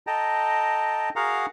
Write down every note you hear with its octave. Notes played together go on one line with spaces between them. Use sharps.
A4 D#5 G5 A5 A#5
F#4 G#4 A#4 F5 F#5 A#5